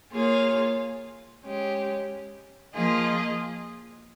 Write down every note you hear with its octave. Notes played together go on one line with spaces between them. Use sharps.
A#3 F4 G#4 C#5 F5
G#3 C#4 G4
F3 A#3 F4 G#4 D#5